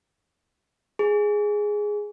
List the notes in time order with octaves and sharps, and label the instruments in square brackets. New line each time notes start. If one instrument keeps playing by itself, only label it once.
[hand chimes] G#4